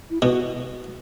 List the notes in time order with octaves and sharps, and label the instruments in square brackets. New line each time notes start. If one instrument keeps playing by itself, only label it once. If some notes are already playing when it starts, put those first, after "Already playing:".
[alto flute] E4
[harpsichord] B2 [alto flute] F#4